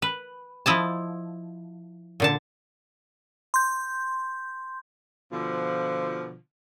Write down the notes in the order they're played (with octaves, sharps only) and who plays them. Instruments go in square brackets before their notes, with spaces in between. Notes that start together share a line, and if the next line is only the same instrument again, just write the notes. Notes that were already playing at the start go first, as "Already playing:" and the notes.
[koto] B4
F3 E4 D#5 A5
A#2 D3 A5
[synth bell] C6 G6
[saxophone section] B2 D3 F3